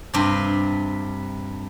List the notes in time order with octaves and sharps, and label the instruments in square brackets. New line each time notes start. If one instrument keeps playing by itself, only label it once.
[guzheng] G2 C3